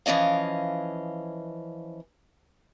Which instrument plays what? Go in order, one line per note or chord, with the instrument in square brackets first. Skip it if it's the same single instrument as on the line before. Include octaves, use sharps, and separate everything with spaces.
[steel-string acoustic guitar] E3 F3 C#4 D#5 F5